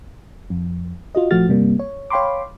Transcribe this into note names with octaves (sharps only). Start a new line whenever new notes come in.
F2
F4 F#4 D#5
A#1 F3 A3 F#4 F6 A6
G1 C3 G3 A#3
C#5
C#5 F5 G5 B5 C6 D6